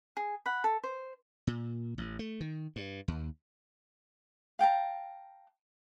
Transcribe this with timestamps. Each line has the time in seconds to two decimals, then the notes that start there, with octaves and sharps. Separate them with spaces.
0.17 G#4
0.46 F#5 B5
0.64 A4
0.84 C5
1.47 A#2
1.98 A1
2.19 A3
2.41 D#3
2.76 G2
3.08 D#2
4.59 F5 G5 A5 A#5